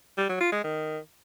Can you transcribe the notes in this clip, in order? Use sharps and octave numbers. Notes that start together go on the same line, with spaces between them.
G3
F#3
F4
G#3
D#3